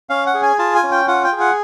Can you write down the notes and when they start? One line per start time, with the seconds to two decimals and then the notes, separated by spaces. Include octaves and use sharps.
0.09 C#4 F5
0.26 F#5
0.34 G#4
0.43 G#5
0.59 F4 A5
0.75 G#5
0.83 C#4
0.91 G5
1.08 F4 F#5
1.24 G5
1.33 G#4
1.40 F#5